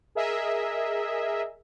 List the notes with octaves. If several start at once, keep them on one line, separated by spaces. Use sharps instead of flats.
G#4 A#4 D#5 E5